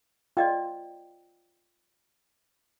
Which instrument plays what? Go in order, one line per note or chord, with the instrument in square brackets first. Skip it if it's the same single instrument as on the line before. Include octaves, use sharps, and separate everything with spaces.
[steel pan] F4 [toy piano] D5 D#5 G5